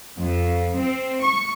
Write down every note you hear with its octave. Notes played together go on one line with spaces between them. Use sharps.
F2
C4
C#6